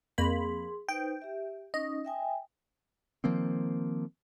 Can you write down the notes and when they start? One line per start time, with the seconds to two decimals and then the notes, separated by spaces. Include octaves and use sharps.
0.18 F2 A#3 G#4 B5 C6
0.89 D#4 B4 C5 G5
1.22 G4 E5
1.74 C#4 D#4 D#5
2.05 E5 G5 G#5
3.24 D#3 F3 A#3 C4